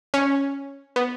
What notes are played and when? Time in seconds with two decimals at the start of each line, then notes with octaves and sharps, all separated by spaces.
0.14 C#4
0.96 B3